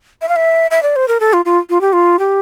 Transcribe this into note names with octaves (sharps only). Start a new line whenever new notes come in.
E5
F5
E5
E5
D5
C5
A#4
A4
F4
F4
F4
G4
F4
G4